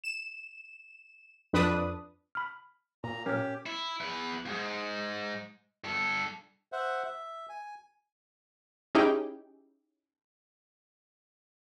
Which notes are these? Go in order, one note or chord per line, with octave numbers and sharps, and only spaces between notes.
E7
F2 D4 B4 D#6
B5 F6
A#2 A#5
C#4 G4 A#4 F6
E4
E2 B4
F2 G#2
G2 A4
C5 E5 F#5
E5
G#5
C#4 D#4 E4 G4 G#4 G5